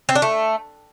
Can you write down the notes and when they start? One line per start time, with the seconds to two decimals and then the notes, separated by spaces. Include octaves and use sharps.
0.09 C4
0.15 D4
0.22 A3